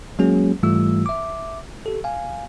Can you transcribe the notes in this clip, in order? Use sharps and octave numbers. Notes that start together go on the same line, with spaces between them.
F#3 G#3 A#3 C#4 F#4 G#4
G#2 E3 G3 A3 F4 E6
E5 D6
G4 A4
F5 G#5